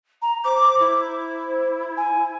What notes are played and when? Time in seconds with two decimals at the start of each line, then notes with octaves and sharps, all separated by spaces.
0.22 A#5
0.44 C5 D6
0.80 E4
1.97 G#5